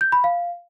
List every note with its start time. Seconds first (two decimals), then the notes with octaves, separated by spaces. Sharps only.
0.01 G6
0.12 B5
0.24 F5